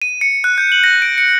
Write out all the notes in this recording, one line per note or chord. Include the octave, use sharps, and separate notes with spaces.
D#7
C#7
F#6
G6
F#7
A#6
D7
C#7